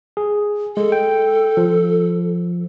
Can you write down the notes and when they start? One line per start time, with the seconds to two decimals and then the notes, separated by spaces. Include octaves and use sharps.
0.17 G#4
0.77 G#3 A4
0.92 G5
1.57 F3